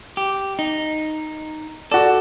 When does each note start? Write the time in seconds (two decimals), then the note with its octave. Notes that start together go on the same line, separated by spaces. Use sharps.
0.17 G4
0.59 D#4
1.92 F#4 A4 D5